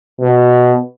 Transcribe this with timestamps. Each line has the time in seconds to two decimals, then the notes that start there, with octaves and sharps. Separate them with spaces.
0.21 B2